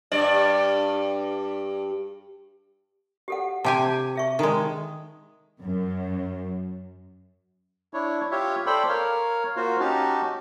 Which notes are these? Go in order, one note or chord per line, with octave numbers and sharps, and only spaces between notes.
G2 D5
G4 A4 F#5
C3 G4 G#5 A5
G#4 E5 C#6
D#3 G#3 D#4 D#6
F#2
D4 E4 C#5
F4 G4 C#5 E5
A4 C5 D5 G5 B5
A#4 C#5 F5
A#3 F4 F#4 C5
C#4 D#4 F#4 G4 A5